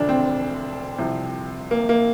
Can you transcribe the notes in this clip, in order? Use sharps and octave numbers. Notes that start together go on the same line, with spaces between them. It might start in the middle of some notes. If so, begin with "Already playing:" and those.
Already playing: E1 D2 D3 F3 D4
C4
C2 C3 F3
A#3
A#3